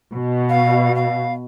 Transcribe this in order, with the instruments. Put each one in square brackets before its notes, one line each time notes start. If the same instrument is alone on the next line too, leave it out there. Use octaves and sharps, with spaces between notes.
[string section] B2
[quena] F5
F5